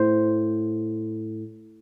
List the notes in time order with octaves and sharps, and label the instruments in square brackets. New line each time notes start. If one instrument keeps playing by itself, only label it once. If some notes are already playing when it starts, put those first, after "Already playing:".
Already playing: [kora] A2 C5